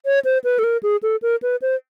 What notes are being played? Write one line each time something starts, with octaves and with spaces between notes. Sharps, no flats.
C#5
C5
B4
A4
A#4
G#4
A4
A#4
B4
C5